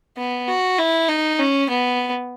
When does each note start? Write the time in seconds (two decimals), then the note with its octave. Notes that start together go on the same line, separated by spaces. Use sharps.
0.17 B3
0.48 F#4
0.78 E4
1.09 D#4
1.39 C#4
1.70 B3